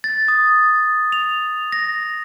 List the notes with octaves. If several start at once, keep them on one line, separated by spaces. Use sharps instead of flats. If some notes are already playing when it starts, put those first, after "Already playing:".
A6
D#6
F7
A#6